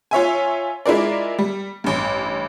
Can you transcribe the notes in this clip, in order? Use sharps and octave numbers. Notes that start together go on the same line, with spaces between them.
F4 C#5 E5 G#5
G#3 E4 F4 A#4 D5
G3
A1 G2